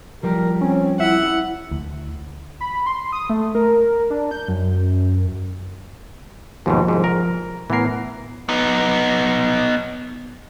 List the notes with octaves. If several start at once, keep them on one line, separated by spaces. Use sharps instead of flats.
F3 G3 G4 A#4
C4 C#4
E4 E5 F#5
D2
B5
C6
D#6
A3
A#4
D4
G6
F#2
D#2 G#2 B2 F3
C2 G#2
A#4
A2 E3 B3 A#4 C7
B3 D#4